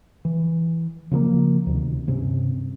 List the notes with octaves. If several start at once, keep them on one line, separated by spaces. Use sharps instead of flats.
E3
C#3 F3 G#3 A#3
D2 C3 D#3
G2 C3 C4 C#4